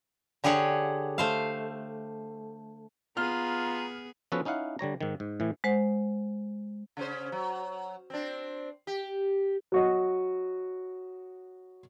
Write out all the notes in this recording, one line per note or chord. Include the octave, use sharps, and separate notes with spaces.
D3 G4 G#4 C#5 F#5
A3 C5 F5
B3 F4 G#4 A#5 F6
F3 B3 C#4 F#4 A4 B4
C#4 D#4 E4 F5 F#5
D3 G3 C#5 A#5
G#2 D#3
G#2
A2 E3
G#3 C5 F#5
C#3 C#4 C5
F#3
C4 D4
G4
F#3 F#4 D#5